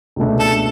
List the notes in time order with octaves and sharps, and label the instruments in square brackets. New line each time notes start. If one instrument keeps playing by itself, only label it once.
[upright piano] C#2 B2 A3 D4
[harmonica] A4